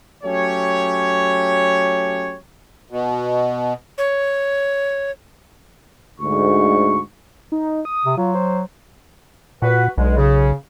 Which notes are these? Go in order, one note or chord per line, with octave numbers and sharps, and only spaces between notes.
F#3 A3 C#4 G4 C#5
B2
C#5
D2 G#2 C#6
D#4
D#6
C3
F#3 F4
C5
A#2 F#4 B4
B1 B2 D3 G#3
C#3